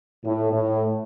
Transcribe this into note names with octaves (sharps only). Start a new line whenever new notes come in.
A2
A2